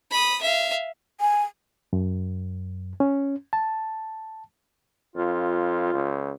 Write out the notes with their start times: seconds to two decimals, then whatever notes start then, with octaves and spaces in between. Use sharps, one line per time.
0.11 B5 D#6
0.41 E5 F5
1.20 G#5
1.93 F#2
3.00 C#4
3.53 A5
5.16 F2 F4
5.93 C#2